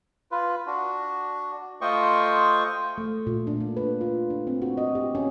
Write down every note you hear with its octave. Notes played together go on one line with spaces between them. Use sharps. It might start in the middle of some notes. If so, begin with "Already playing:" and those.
F4 B4
D4 F#4
A3 F4 C5 D#5 G5 C#6
A3
A#2
D4
A#3
B4
F4
D4
C4
F#4
D#5
G4
C#4